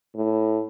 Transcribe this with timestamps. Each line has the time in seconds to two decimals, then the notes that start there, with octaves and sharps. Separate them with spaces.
0.15 A2